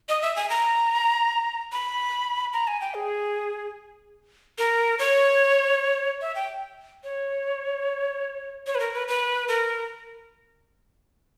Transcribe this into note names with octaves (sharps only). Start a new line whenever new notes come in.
D#5
E5
G#5
A#5
B5
A#5
G#5
G5
G#4
A#4
C#5
E5
G5
C#5
C#5
B4
A#4
B4
B4
A#4